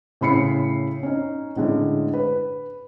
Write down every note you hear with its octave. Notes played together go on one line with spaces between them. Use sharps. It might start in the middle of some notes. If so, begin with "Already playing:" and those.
A2 C#3 B5 C7 C#7
C#4 D#4
A2 D3 G#3 C#4
B4